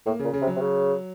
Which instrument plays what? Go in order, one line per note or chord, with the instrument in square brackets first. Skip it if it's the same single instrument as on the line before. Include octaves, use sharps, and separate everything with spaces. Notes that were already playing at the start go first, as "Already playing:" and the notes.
[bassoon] A2 [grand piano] A#3
[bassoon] A#2 [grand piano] C#3
[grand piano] C#3
[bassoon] C3
[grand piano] F#3
[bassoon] C3
C#3